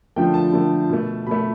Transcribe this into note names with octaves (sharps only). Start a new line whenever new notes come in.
D3 F3 A3 G5
A5
D3 F3 A3
B2 A3
B2 A3 B5